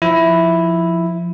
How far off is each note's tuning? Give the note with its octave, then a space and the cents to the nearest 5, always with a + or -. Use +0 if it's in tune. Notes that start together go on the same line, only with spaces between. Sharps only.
F3 +0 E4 +0